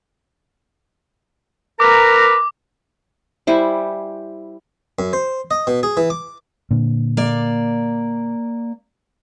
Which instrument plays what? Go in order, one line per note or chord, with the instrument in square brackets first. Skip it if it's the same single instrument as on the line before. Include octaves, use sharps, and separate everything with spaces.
[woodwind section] A#4 B4 A#5 [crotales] D6
[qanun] G3 E4 C5 G#5
[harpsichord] F#2
C5
D#5
B2
G#4
E3
D6
[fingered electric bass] A#2 D3
[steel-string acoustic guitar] A#3 D5